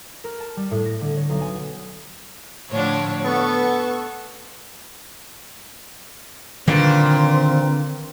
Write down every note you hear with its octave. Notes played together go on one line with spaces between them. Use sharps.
A#4
A5
G3
A2
A#6
D3
C#5
B1
G#5
A2 D3 F3 D4 E4 C#5
B3 A4 C#6
A#2 D3 D#3 C4 B4